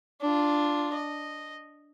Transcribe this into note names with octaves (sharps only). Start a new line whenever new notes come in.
D4 F4
D#5